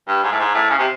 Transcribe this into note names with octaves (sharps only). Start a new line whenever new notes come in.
G2
G#2
A2
G#2
A2
C#3
C3